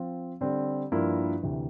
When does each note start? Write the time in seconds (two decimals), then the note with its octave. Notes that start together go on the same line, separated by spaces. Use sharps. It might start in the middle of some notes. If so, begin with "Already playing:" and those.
Already playing: F3 C4 F4
0.41 D3 G3 C4
0.92 G2 F3 A#3 E4 A#4
1.43 D2 C3 E3